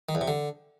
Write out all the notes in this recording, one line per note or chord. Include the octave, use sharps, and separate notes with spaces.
D#3
E2
C3
D3